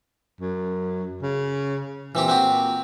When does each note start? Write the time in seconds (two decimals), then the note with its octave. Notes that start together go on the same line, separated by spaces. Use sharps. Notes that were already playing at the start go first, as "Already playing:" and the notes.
0.41 F#2
1.22 C#3
2.15 A#2 E3 C4 G4
2.28 C4 F#4 G4